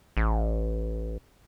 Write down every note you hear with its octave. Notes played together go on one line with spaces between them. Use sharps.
A1